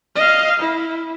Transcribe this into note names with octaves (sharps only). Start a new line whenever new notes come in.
D#5 F5
E4